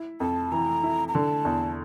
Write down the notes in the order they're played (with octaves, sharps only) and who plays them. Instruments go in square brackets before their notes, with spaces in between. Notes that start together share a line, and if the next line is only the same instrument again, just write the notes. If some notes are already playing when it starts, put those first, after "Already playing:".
Already playing: [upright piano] E4
[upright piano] F2 [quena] A5
[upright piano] E3 [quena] A#5
[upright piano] E4
[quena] A#5
[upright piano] D3 [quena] A5
[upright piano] E2